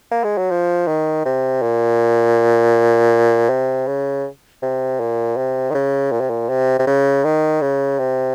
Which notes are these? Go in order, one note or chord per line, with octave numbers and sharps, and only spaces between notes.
A#3
G#3
F#3
F3
D#3
C3
A#2
C3
C#3
C3
A#2
C3
D#3
C#3
A#2
C3
A#2
C3
C3
C#3
D#3
C#3
C3